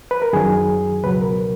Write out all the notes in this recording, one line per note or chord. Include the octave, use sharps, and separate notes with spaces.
B4
A#4
F#2 D#3 F#3 G#4
C#2 B2 F#3 B4
A#4